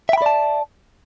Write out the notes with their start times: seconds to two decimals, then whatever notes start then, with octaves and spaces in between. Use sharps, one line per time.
0.09 E5
0.13 G5
0.18 B5
0.22 D5
0.26 A5